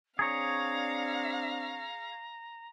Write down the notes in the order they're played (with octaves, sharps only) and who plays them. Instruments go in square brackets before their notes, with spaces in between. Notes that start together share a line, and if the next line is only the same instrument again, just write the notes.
[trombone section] C4 D4 [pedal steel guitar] G#4 C#5 [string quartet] F5 [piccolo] A#5